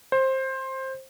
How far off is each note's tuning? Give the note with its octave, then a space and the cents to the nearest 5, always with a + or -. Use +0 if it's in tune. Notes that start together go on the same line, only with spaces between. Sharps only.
C5 +15